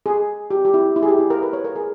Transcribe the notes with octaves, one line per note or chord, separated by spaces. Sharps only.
G#4
G4
G4
E4
E4
G#4
G4
E4
A#4
B4
C#5
A#4
G#4